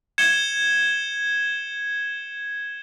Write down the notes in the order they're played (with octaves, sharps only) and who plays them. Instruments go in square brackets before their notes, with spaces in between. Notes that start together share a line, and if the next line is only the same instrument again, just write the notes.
[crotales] G#6 C#7 E7 G7